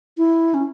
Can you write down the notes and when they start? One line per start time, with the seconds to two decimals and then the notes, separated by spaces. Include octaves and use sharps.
0.17 E4
0.54 C#4